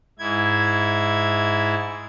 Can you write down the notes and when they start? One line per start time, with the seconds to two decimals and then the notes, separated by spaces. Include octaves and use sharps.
0.19 G#2 E4 G#6